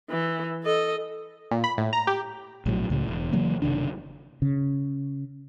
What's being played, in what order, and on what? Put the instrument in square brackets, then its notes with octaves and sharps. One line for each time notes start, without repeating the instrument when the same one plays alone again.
[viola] E3
A4 D#5
[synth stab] A#2
B5
A2
A#5
G4
[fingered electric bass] A#1 A2 F3 F#3
C#2 A2 C#3
E1
C#3 E3 F#3 A#3
F#1 C3 D#3 D4
[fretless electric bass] C#3